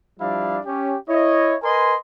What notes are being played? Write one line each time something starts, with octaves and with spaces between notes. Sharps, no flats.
F3 G3 D4 E4 D5 F5
C#4 G4
E4 C#5 D#5
A#4 B4 D#5 G#5 C6